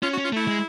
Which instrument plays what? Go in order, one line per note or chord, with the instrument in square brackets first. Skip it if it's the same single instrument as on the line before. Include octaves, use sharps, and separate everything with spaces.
[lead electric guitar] C#4 [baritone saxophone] F4
[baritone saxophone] F#4
[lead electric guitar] C#4
[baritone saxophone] F4
[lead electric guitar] A3 [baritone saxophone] E4
[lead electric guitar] G#3